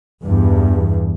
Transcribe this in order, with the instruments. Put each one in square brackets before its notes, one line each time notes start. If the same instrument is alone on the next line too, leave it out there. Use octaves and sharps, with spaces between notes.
[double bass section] E2 G2